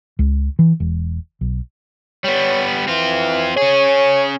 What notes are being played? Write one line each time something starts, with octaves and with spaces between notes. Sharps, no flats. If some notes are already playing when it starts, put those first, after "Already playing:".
C#2
E3
E1
B1
G3 B3 C#5
E3 C4 F4
C#4 G#4 C#5